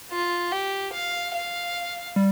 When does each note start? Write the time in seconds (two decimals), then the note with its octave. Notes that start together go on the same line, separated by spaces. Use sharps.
0.11 F4
0.52 G4
0.93 F5
1.34 F5
2.16 G3